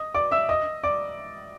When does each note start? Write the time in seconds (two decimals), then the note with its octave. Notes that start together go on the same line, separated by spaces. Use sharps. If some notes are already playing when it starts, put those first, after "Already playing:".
Already playing: D#5 D#6
0.15 D5 D6
0.31 E5 E6
0.49 D#5 D#6
0.83 D5 D6